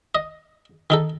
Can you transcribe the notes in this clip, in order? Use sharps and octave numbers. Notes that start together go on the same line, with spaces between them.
D#5
D#3 D#4 A4